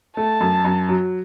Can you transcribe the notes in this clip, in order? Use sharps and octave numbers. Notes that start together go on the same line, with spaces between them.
A3 A5
F#2
F#2
F#3